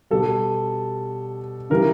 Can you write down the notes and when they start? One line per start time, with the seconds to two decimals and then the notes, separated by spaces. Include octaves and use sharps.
0.11 B2 G3 A4
1.70 C#3 E3 G3 A#4